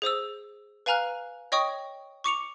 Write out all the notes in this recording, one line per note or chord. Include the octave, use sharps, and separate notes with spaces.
G#4 C5 D#6 E6
B4 F5 G#5 A#5 F6 F#6
C#5 D#5 G5 C#6 D#6
C#6 D6 C#7 F7